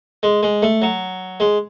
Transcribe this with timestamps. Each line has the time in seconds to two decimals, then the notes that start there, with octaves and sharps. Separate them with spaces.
0.23 G#3
0.43 G#3
0.63 A3
0.82 F#3
1.40 G#3